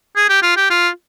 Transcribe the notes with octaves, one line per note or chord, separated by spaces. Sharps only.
G#4
G4
F4
G4
F4